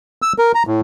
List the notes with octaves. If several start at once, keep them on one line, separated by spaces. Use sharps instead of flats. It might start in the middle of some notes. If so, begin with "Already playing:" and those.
E6
A#4
A#5
A2